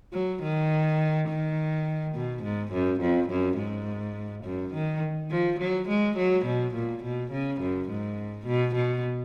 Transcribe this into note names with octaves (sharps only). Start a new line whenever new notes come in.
F#3
D#3
D#3
B2
G#2
F#2
F2
F#2
G#2
F#2
D#3
F3
F#3
G#3
F#3
B2
A#2
B2
C#3
F#2
G#2
B2
B2